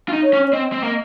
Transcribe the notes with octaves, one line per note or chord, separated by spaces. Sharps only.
F4
D#4
C#5
C#4
C#5
C4 D#5
C4
A#3